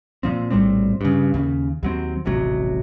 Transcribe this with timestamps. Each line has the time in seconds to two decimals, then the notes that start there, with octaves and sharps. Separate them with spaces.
0.23 A#2 F3 C4
0.51 A#1 A2 G3 C4
1.01 G2 C#3
1.34 D#2 C#3
1.83 D#2 F#3 C4
2.25 D#1 A1 C3 F#3